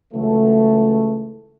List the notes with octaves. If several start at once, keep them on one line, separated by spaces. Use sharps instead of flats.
C#2 C#3 E3 F#3 A3